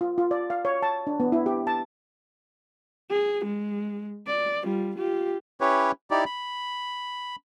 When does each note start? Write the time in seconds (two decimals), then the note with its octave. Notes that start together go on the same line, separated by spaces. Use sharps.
0.01 F4
0.18 F4
0.31 D5
0.50 F5
0.65 C#5
0.82 A5
1.07 D4
1.20 B3
1.32 E4
1.46 G4
1.67 A5
3.10 G#4
3.44 G#3
4.27 D5
4.63 G3 F4
4.95 F4 G4
5.60 C#4 E4 G4 B4 C#5
6.11 D#4 E4 G4 D5
6.26 B5